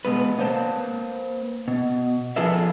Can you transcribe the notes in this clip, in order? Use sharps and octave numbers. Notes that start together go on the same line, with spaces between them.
B2 G#3 B3 B4
A#3 B4 C5 A5
B2
F3 F4 G#4 A4 B4 E5